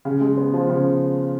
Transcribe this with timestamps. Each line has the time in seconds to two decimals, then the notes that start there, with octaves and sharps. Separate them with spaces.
0.05 C#3
0.21 G#3
0.37 B3
0.54 F3
0.70 C#3